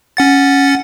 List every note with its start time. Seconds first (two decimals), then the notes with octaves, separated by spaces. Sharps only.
0.17 C#4 F#5 A6